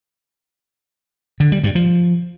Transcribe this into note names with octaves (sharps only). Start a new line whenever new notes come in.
D3
G3
G2
F3